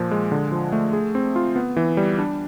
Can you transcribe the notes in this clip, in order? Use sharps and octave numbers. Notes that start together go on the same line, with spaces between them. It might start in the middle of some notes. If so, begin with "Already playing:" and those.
Already playing: A#2 F3
G#3
D3
F3
A3
G#4
C4
F4
B3
E3
G3
D4